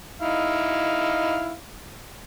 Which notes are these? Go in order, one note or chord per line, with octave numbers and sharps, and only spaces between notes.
D#4 E4 F5